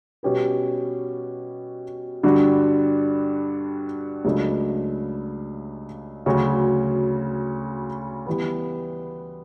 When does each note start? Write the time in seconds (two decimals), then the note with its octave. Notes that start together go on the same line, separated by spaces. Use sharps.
0.23 B2 G3 C#4 G4 B4
2.23 G2 D3 G3 D4 F#4
4.25 C#2 C#3 F#3 A3 D4
6.26 D2 C#3 F#3 C#4 F#4
8.26 E3 G3 B3